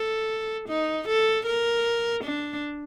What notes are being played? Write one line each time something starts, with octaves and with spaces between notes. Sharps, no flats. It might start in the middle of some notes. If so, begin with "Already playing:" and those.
Already playing: A4
D#4
A4
A#4
D4